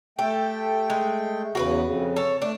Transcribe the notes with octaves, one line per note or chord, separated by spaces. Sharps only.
A3 G4 A4 G5
G#3
E2 C#3 F#4 A#4 B4
F2 C#3
A4 C#5
A3 D4